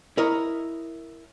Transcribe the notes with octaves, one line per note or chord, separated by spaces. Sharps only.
E4 A#4 C#5 D#5